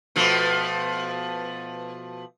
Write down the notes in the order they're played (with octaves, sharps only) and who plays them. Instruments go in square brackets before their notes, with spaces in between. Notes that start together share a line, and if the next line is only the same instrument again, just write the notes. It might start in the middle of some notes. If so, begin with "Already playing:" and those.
[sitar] B2 F3 A3